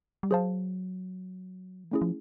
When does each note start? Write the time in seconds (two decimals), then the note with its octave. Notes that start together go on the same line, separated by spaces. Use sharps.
0.23 G3
0.31 F#3 G#4 C5 F5 A5
1.84 E3
1.91 F3 A3 C#4 E4 G#4
2.02 F3